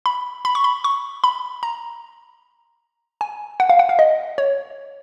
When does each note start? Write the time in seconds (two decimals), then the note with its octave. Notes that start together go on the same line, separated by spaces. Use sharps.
0.06 B5
0.45 B5
0.55 C#6
0.64 B5
0.84 C#6
1.24 B5
1.63 A#5
3.21 G#5
3.60 F#5
3.69 F5
3.79 F#5
3.89 F5
3.99 D#5
4.38 C#5